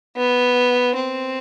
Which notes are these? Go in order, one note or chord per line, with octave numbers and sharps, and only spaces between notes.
B3
C4